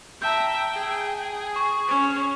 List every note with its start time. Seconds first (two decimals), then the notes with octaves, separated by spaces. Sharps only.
0.22 E5 G5 A5 A#5 G6
0.74 G#4
1.56 C#6
1.87 C#4